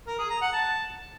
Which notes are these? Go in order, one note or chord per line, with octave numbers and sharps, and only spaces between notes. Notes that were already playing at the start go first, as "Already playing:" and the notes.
A#4
G#4
A#5
F#5
A5